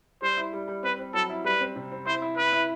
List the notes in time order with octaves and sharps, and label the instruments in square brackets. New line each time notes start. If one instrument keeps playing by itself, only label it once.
[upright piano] G3 [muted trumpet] C5
[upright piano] E4
G3
G3
[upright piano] C4 [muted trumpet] B4
[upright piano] C4
[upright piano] F#3 [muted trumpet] A4
[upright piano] E4
[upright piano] G3 [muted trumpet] B4
[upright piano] C4
C3
C4
[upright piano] E4 [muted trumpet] C5
[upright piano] E4
[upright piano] E4 [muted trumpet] B4
[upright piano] E4